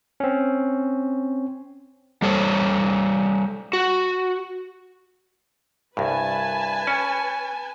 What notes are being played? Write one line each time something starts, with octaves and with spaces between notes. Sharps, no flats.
C4 C#4
G3 A4 C5 C#5
F#4
C2 G2 B4 G#5 A5
C#4